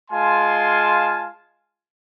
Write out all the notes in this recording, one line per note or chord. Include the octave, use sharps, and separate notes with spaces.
G#3 F4 F5 G#5 A5 C6